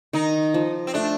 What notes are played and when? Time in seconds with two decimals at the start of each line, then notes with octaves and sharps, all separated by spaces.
0.13 D#3 D#4
0.54 F3
0.87 C4
0.94 A3 D4